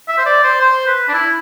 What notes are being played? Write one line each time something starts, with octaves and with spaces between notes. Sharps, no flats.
E5
C5
D5
C5
C5
B4
D4
E4